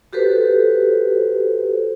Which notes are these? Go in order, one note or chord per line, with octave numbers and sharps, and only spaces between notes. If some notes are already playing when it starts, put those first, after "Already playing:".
F#4 G4 A4 B4 C5